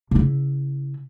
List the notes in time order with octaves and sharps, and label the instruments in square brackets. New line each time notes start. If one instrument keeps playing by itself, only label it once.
[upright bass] C#3 E4